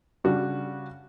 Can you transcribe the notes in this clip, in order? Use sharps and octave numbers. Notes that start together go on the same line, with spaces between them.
C#3 G3 D4 F#4 G4